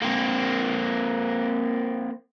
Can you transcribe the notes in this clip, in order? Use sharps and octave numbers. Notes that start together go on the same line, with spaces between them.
A#3 C4